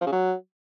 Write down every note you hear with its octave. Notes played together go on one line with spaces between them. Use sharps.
F3
C#3
F#3